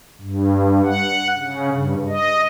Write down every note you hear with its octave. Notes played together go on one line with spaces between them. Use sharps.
G2
F#5
C#3
G2
D#5